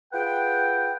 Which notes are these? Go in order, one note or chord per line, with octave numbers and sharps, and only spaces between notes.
F4 G#4 B4 F#5 G5